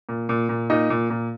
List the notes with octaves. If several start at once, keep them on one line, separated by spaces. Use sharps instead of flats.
A#2
A#2
A#2
A#2 D#4
A#2
A#2